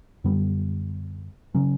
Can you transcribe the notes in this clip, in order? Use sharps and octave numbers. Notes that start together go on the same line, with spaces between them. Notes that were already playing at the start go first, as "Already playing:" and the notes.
F#2 D3 G3 B3
C#3 F#3 C#4